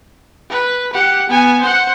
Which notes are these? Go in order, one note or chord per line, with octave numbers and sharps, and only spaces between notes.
B4
G4 F#5
B3 G#5
C5 F#5